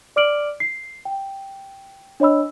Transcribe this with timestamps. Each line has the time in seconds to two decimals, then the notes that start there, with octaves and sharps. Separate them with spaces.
0.16 D5 D6 F6 D7 F#7
0.60 C7
1.05 G5
2.20 D4 C#5 D#5 B5 E6